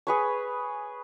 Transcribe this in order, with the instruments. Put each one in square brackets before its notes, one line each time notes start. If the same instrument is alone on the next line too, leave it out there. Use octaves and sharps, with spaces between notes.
[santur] G#4 B4 C#5